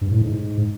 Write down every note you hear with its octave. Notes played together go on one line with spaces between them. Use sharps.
G2
A2
G#2